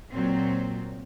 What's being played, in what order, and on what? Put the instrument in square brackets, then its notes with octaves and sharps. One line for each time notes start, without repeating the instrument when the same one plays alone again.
[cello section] A#2 F#3 C4